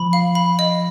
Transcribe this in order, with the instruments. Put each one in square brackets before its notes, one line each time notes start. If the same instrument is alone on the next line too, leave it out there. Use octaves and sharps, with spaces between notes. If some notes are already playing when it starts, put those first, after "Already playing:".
Already playing: [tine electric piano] F3 [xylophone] B5
[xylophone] F5
B5
D#5